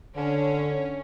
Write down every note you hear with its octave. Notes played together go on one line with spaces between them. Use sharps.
D3 C#4